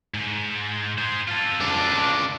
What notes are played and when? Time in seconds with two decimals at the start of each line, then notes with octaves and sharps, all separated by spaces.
0.14 G#2
0.98 G#4 C5
1.28 F4 A4
1.60 C#2 D4